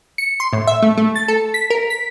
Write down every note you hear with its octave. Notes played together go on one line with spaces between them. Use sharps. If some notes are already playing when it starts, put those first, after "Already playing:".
C#7
C6
A2
E5
A3
A3
A6
A4
B6
A#4
B6